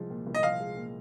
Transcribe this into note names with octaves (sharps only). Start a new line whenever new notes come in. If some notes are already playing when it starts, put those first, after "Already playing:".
Already playing: C2 F3 G#3
A#2
C2
D#5
F3 F5
G#3
A#2